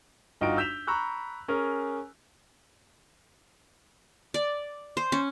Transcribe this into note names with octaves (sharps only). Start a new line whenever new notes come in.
G1 D#4 F4 F#4 G5 D7
E6 G6 B6 E7 F7
A#5 B5 C#6 E6 F#6
C#4 G#4 A#4
D5
C5
C#4